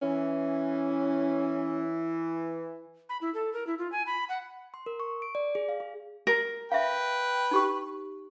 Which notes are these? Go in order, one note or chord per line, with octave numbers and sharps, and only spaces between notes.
E3 C#4
B5
E4
A4
A#4
E4
F4
G#5
B5
F#5
C6
A#4
C#6
D7
D5
G#4
F5
G#4
A#4
B4 E5 F5 G5
D#4 G4 C#6